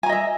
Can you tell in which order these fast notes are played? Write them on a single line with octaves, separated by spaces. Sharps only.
G#5 A#5 D#5 E5